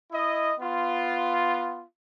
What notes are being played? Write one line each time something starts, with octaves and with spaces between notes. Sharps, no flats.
E4 D#5
B3 F4